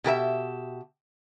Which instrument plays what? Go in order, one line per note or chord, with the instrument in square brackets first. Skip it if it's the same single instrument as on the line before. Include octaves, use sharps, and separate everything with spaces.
[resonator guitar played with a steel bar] B2 G4 A#4 E5